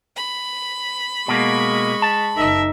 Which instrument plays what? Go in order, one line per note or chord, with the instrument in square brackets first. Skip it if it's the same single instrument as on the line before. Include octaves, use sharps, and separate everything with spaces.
[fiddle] B5
[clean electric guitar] B2 A#3 [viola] G#3 C#6
[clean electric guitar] A5
[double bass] F#1 D#4 [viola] A#4 E5